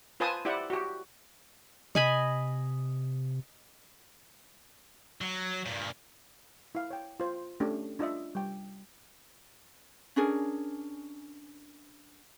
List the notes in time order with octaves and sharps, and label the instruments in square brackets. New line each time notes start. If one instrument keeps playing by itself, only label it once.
[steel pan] F4 B4 C5 G#5 A5 D#6
E4 G4 C5 D5 F#5
F#4 G4
[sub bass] C3 [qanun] D#5 G#5 B5
[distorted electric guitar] F#3
G2 A#2
[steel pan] E4 F5
C#5 G5
F4 C5
A3 C#4 D4 G4
D4 F4 D#5 E5
G3 G5
[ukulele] C#4 D4 G#4 A#4